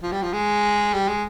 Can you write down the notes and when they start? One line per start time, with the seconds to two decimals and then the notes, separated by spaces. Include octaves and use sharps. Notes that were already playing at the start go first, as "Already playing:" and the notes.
0.03 F3
0.12 G3
0.23 F3
0.33 G#3
0.94 G3
1.08 G#3